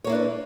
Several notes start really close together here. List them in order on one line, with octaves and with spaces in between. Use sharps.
C#5 A#3 E4 D4 B4